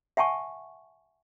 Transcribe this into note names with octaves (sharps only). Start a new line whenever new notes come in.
E5 F#5 G#5 A5 C#6